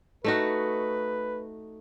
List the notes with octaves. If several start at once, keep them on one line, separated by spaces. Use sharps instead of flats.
A3 D#4 F#4 B4